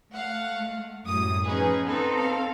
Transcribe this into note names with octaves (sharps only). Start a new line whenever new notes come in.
A3 F5 F#5
F#2 A2 G3 D#6
F3 C#4 D#4 G#4 B4
B3 C4 D#4 A4
F5